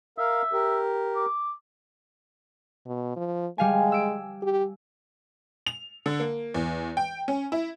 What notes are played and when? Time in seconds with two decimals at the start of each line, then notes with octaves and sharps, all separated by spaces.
0.18 A#4 E5 F5
0.53 G4 A#4
1.16 D6
2.86 B2
3.16 F3
3.58 G3 G#3 F5 G#5
3.92 E6 D7
4.42 G4
5.67 F7
6.06 D3
6.20 A#3
6.54 E2
6.97 G5
7.28 C#4
7.52 E4